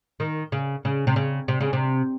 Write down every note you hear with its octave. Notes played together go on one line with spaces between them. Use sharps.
D#3
C#3
C#3
C3
C#3
C3
C#3
C3